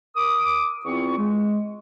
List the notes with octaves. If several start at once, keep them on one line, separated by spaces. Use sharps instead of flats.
A#4 D6 D#6
E2 C4 E4 F4 C#6
G#3